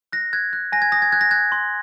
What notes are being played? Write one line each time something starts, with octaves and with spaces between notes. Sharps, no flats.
F#6 A#6
F#6 G#6
F#6
G#5 A#6
G#6
D#6 A#6
G#6
F#6 G#6
A#6
F#6 G#6
C6